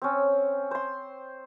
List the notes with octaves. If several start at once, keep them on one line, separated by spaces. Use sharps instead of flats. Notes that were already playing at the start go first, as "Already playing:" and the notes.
C4 C#4
C5 C6